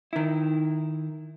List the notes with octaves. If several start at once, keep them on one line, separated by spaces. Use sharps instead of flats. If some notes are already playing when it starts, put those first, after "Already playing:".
D#3 E4